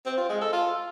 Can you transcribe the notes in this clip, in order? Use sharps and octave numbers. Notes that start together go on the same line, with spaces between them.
C4
F4
G#3
A4
F4